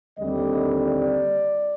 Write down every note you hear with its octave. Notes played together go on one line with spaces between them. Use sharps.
D#2 D3 G3 C4 D#5
D5